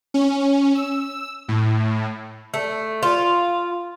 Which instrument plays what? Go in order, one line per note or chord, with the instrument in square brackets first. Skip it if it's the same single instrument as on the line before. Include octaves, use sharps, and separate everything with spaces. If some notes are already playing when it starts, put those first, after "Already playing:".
[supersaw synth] C#4
E6
A2
[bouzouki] A3
F4